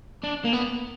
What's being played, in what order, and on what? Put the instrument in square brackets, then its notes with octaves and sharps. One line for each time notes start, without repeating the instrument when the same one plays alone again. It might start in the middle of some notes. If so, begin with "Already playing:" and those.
[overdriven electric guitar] D4
A#3
B3